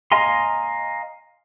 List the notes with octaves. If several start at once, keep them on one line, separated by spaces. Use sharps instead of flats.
D#5 F5 G#5 A#5 C6